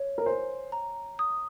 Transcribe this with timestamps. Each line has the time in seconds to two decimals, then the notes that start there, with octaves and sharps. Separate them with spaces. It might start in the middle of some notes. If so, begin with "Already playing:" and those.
Already playing: C#5
0.18 A#4
0.26 C5 G#5
0.72 A#5
1.19 D#6